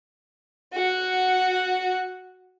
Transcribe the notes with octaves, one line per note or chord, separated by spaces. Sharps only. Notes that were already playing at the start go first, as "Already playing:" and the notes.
F#4 F#5